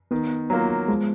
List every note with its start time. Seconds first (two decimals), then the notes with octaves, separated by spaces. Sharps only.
0.11 D#3 B3
0.50 F#3 A#3 F4
0.88 F3 G#3